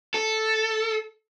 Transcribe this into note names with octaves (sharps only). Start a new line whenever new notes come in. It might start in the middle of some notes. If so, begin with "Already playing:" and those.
A4